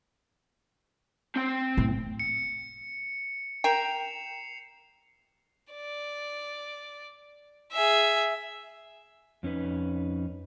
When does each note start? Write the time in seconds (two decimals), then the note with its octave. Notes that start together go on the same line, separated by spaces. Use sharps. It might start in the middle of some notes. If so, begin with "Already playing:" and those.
1.36 C4 G5
1.78 A2
2.20 C#7
3.64 A#4 G5 C7 E7 F7
5.74 D5
7.72 G#4 E5
9.43 F2 C#4 D#4 B4